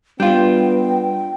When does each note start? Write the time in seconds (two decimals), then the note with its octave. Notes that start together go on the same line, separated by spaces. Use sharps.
0.20 G3 B3 D4 F4 G5 G6